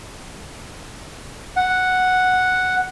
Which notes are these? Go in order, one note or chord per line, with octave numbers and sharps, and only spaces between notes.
F#5